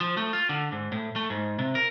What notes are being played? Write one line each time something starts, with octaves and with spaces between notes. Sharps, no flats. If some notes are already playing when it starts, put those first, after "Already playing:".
F3
A3
F4
D3
G#2
A2
A3
G#2
C3
A#4